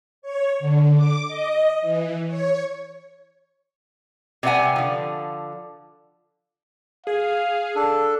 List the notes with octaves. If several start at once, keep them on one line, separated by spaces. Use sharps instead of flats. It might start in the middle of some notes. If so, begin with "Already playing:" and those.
C#5
D3
D6
D#5
E3
C#5
C3 G3 B4 E5 F#5 G#5
D3 F3
G#4 F5
D4 A4